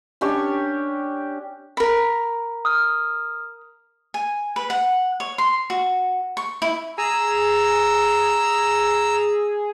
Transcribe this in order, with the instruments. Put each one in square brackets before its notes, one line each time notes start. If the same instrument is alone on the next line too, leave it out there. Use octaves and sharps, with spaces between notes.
[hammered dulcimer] C#4 D4 G4 C#6
[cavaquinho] A#4 B5
[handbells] D#6 F6
[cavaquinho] G#5
B4
F#5
C#5
C6
F#4
C#6
E4
[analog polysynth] G#4 [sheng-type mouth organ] A#5 E6